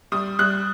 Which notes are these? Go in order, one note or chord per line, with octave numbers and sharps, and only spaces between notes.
G3 D#6
G3 F#6